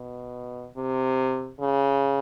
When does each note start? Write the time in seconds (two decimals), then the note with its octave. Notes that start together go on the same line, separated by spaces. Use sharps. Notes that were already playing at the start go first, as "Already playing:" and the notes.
Already playing: B2
0.77 C3
1.60 C#3